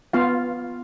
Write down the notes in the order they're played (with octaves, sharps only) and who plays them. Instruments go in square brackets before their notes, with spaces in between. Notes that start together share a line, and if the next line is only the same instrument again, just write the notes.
[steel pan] B3 F4 F5